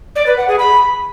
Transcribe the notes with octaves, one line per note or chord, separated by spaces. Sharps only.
D5
B4
F#5
G#4
B5